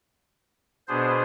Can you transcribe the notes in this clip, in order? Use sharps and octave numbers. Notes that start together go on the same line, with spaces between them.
B2 B3 D4 G#4 C5